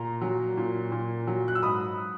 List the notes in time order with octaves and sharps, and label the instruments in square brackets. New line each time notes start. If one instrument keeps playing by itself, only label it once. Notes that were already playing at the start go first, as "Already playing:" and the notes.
Already playing: [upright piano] A#2 A#5
F#3
A#2
A#2
F#3
F#6
E6
G#2 B5 D#6